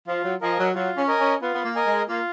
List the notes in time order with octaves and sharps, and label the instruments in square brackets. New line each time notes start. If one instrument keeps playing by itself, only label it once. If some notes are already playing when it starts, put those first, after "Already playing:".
[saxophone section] F3 [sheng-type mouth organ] F4
[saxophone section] F#3
[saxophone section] F3 [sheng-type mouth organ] A#4 D#5 G#5
[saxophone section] F#3
[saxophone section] F#3 [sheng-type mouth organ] F4
[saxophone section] C#4
[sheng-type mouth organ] A#4 D#5 G#5
[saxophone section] C#4
[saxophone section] B3 [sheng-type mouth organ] F4
[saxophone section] B3
A#3
[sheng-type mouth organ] A#4 D#5 G#5
[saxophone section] G#3
[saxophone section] A#3 [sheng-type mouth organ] F4